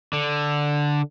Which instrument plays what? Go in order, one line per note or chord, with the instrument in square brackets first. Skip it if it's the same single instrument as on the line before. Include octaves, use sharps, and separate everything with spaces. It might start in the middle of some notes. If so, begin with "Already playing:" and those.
[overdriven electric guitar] D3